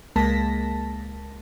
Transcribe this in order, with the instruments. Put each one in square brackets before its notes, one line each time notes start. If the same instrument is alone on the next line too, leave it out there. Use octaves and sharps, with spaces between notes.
[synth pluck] C#2 G#3 A#3 A5 A#6 B6